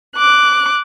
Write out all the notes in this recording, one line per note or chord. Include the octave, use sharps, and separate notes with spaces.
D6 F#6